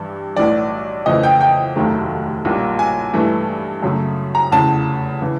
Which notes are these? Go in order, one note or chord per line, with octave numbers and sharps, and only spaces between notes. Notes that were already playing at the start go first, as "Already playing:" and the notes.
Already playing: G2 E3 G3
B1 A2 E3 D5
F2 C#3 E3 A3 D#5
G5
G5
F1 D#2 D#3 F#3 A3
B1 A#2 G3 A#3
G#5
G2 E3 A3
F#2 C#3 F#3 A3
A#5
F1 E2 C#3 A5
C#3 E3